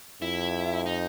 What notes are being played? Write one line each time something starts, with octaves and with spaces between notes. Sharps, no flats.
F2 E4
D#4